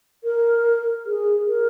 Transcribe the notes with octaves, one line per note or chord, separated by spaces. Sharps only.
A#4
G#4
A#4